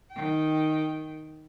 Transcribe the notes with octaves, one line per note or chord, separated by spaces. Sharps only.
D#3 G5